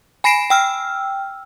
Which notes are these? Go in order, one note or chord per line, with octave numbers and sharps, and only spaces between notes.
G#5 B5 A#6 C7 D7 E7
G5 E6 F6